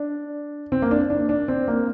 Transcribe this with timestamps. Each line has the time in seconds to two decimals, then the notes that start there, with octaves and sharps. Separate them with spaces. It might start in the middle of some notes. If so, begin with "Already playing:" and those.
Already playing: D4
0.72 C4
0.82 A#3
0.91 D4
1.10 D4
1.29 D4
1.48 C4
1.68 A#3